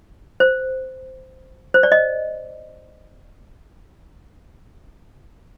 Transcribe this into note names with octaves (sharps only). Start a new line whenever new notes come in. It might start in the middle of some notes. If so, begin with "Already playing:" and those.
C5
C5
D5
D#5